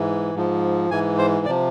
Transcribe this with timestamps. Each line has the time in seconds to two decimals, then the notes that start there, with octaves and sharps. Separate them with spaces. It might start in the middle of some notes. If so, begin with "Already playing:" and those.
Already playing: G#2 E3
0.35 G#2 F3
0.90 G#2 E3 G#5
1.18 C5
1.45 C3 F3 D5